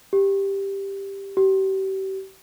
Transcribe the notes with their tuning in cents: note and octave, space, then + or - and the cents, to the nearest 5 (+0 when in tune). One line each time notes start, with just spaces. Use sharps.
G4 +5
G4 -35